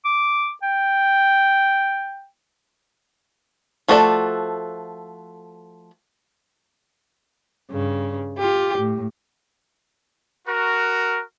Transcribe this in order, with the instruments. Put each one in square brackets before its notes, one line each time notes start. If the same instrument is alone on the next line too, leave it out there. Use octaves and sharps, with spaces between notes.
[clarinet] D6
G5
[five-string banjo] F3 A3 F#4 A4 D5
[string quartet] G2 C#3
F4 G4
A2
[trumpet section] F#4 A#4